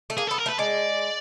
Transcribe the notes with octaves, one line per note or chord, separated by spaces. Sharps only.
A3
A#3 G#4
B3 A4
A#4
A3
B4
G#3 D5